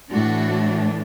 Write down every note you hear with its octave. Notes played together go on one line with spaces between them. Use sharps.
A2 E3 A3 D4 F#4